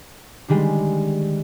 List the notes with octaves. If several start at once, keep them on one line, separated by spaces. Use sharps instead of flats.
D3 D#3 G3 G#3